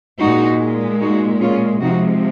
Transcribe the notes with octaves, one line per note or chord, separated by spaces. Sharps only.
A#2 G#3 D#4 F#4
D#4 F#4
C#4 F4
C3 F3 G#3 D#4 F#4